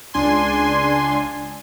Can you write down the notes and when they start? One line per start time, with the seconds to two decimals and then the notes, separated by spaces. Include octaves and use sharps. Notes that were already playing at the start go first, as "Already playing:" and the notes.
0.14 C#2 D4 G#5 C6